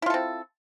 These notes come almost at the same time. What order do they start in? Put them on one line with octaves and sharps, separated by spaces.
E4 F4 A4 C4